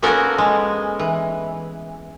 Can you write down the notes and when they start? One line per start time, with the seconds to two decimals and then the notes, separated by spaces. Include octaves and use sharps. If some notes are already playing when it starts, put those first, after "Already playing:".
0.02 A#3 B3 C#4 F#4 A4 A#4
0.38 G#3
0.99 E3